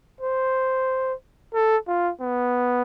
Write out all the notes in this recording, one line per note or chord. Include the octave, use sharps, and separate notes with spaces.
C5
A4
F4
B3